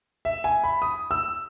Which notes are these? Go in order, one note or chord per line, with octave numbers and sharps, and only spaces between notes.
E5
G#5
B5
D#6
E6